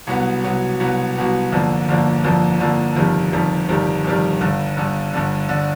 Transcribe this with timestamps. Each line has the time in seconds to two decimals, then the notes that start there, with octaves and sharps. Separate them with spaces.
0.07 C2 B2 F#3 B3
0.44 C2 B2 F#3 B3
0.80 C2 B2 F#3 B3
1.16 C2 B2 F#3 B3
1.52 G1 F2 D3 F3 A#3
1.88 G1 F2 D3 F3 A#3
2.24 G1 F2 D3 F3 A#3
2.60 G1 F2 D3 F3 A#3
2.96 G1 F2 C3 D#3 G3
3.32 G1 F2 C3 D#3 G3
3.69 G1 F2 C3 D#3 G3
4.04 G1 F2 C3 D#3 G3
4.41 G1 G2 D3
4.77 G1 G2 D3
5.13 G1 G2 D3
5.49 D3